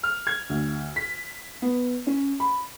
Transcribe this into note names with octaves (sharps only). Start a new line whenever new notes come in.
F6
G#6
D2
B6
B3
C#4
B5